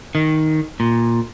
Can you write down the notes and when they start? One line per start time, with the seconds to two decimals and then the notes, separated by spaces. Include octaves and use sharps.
0.15 D#3
0.80 A#2